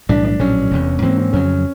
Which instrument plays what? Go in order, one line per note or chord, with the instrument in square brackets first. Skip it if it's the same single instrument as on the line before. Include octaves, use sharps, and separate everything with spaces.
[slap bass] B1 A2 E3 G3 [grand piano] D4
[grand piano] D4
[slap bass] A#1 A2 F#3 [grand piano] C#4
[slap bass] E1 E2 C3
[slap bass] G#2 E3 G3 A#3 [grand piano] C4
[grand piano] C4
[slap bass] F2 C#3 F#3 [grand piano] C#4